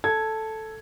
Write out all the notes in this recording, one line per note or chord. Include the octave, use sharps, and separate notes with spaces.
A4 G#6